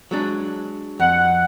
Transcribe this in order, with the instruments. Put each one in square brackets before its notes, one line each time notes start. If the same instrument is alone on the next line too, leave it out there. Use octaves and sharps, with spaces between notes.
[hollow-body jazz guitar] F#3 G#3 D4
[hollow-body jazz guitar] F2 [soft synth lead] F#5